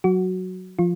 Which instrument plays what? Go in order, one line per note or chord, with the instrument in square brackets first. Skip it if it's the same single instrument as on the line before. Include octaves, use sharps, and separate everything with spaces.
[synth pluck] F#3 F#4
F3 F4